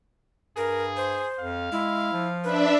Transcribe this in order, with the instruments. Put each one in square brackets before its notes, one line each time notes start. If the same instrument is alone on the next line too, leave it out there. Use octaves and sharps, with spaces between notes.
[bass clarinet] G2 [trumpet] G#4 [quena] A#4
[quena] C5
[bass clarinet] F2 [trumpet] F5
[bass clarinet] G#3 [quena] E4
[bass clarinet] F3
[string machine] D4 E5 [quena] B4